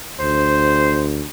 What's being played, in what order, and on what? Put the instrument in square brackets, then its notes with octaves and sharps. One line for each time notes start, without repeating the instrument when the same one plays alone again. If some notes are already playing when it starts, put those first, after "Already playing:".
[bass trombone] D2 [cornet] C5